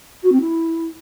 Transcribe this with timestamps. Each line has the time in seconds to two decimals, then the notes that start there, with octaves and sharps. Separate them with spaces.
0.23 F#4
0.32 C4
0.41 E4